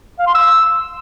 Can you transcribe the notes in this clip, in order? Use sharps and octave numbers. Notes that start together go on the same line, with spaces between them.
F5
C6
E6